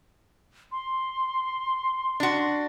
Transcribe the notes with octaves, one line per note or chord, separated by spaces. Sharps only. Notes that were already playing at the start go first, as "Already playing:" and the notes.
C6
D4 F#4